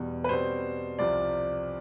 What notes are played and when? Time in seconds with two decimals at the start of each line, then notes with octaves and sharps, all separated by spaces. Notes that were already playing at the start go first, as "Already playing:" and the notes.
Already playing: E2 B2 G3
0.24 B4
0.29 B2 G3 C4 C5
0.99 C2 C3 F3 D5